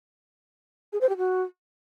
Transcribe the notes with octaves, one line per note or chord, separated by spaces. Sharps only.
G#4
C5
G4
F#4